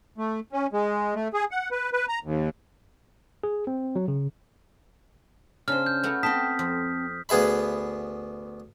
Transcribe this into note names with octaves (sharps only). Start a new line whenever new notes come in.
A3
C#4
G#3
A3
G#4
F#5
B4
B4
A#5
D#2
G#4
C4
F#3
C#3
C#3 D4 C5 F6
G6
A3 B3 F#4
C4 G5 A5 D#6 B6
F2
D2 B3 G#4 E5 B5